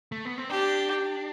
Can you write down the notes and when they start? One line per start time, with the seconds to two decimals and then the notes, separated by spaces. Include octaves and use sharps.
0.12 A3
0.25 B3
0.38 C4
0.50 D4 G4